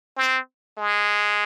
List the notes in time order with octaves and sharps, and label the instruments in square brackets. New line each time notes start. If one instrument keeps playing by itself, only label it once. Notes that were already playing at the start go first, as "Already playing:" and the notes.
[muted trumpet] C4
G#3